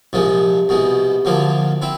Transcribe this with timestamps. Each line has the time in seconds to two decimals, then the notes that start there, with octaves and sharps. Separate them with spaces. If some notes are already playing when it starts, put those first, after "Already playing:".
0.13 C2 A#2 F3 G#3
0.69 C2 B2 G#3
1.25 D2 D3 F3 A#3
1.82 C4 E4